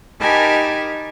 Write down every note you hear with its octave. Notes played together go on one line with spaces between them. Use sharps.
D#4 G4 A#4 G#5 A5 B5